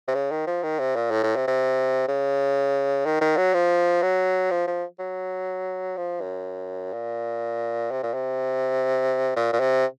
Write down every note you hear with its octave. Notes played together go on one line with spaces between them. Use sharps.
C3
C#3
D#3
F3
D#3
C3
A#2
A2
A2
C3
C3
C#3
D#3
D#3
F#3
F3
F#3
F3
F3
F#3
F3
F#2
A#2
C3
A#2
C3
A#2
A#2
C3